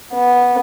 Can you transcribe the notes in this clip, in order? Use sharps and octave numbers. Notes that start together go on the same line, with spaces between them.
B3